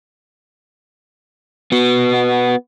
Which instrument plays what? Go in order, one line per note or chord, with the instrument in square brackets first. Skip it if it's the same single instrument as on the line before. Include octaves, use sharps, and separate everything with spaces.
[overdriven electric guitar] B3 F#4